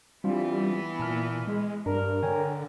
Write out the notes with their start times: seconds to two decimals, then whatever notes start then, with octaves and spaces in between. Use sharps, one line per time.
0.24 E3 G3 B3 C4 D4 F4
0.99 A#2 A5 B5 F6
1.47 G#3
1.86 G2 D4 A#4
2.23 D3 C#5 G5 G#5